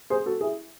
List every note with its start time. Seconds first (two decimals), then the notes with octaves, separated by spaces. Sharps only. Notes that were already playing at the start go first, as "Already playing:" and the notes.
0.10 G#4 C5
0.26 F#4 A4
0.41 E4 G#4